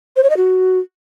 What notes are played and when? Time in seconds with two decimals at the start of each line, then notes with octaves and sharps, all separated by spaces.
0.16 C5
0.23 C#5
0.30 D#5
0.37 F#4